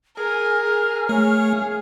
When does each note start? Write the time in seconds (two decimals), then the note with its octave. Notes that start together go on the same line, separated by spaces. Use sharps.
0.17 G#4 A#4 G#5 F6
1.09 A3 C#5 F5